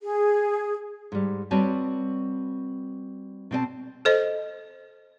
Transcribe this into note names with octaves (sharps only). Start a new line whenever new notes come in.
G#4
G#2 G3
G3 C4 F#4 B4 C#5 A5
B2 C4 C5 A5
A4 C5 D#5